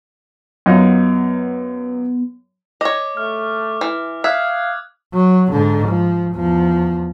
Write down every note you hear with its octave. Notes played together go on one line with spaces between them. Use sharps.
F#2 B3 D#4 F4
C#5 D#5 D6
A3 F6
E3
E5 F5 D#6 F#6 G#6
F#3
G#2 D3
F3
E2 F3